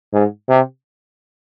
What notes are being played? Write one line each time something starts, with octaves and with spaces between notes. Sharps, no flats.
G#2
C3